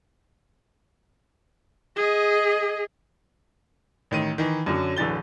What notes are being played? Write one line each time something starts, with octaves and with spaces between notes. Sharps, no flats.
G#4 D#5
A1 D#3 D#7
D#3 E3
F#2 D3 F#3
D1 D3 E3 A6 G7